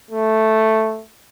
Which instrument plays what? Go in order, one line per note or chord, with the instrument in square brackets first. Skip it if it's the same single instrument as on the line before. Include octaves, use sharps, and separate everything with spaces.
[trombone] A3